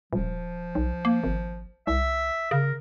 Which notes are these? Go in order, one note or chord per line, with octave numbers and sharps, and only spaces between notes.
D#1 F3
B1
A#3
G#1
C2 E5
C#3 A#4